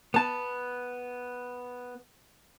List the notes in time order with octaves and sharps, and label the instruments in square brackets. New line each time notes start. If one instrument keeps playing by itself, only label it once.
[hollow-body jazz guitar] B3 A5